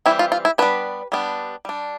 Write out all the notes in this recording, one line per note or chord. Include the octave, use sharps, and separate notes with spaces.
E3 G3 C4 E4
F4
F4
E4
G3 B3 D4 B4
G3 B3 D4
G3 D4